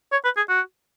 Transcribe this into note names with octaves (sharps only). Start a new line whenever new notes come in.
C#5
B4
G#4
F#4